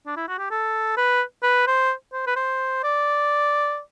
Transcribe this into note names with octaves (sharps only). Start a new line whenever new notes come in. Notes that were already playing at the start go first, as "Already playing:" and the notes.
D4
E4
F#4
G4
A4
B4
B4
C5
C5
B4
C5
D5